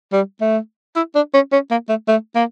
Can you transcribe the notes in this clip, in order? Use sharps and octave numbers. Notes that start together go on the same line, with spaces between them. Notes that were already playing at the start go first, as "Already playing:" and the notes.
G3
A3
E4
D4
C#4
C#4
A#3
A3
A3
A#3